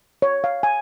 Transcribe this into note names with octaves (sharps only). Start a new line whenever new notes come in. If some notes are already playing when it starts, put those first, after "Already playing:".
C#5
F5
G#5